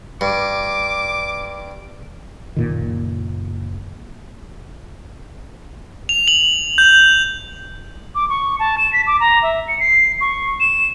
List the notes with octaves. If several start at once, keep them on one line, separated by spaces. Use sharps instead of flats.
G2 D6
F#1 A#2 D#3
F7
F#7
G6
D6
C#6
A5
E7
B6
D6
A#5
E5
C#7
C7
C#6
E7